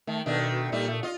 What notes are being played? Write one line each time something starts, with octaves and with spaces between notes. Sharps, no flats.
D#3 A3
B2 D#3 A3 D4
A#2 G3 A3 D#4
A3
F4 D#5